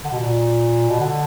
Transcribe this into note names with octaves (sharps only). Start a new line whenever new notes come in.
D3
B2
A#2
B2
D3